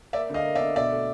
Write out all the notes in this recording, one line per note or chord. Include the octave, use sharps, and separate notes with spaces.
A#3 D5 E5
D3 D#5 F5
A#3
D5 E5
D3
B2 D5 E5
A3